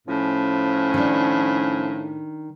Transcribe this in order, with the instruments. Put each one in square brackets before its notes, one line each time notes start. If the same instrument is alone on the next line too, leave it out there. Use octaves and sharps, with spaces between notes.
[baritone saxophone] A2 [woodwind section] F3 C#4
[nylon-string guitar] D#3 D4